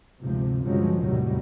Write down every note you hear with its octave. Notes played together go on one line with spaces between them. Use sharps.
D2 G#2 C3 F3
D2 G2 C#3 F3 F#3 G#3
E2 A2 C3 D#3 F#3 G3